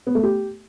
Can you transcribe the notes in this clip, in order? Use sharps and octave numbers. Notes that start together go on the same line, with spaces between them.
B3
A3
G4